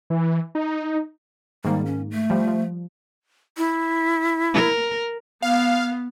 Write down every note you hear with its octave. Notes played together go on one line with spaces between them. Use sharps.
E3
D#4
G#2 D#3 G3 A#3
C#4
A3
F3 G3
F3
E4
A#4
B3 F5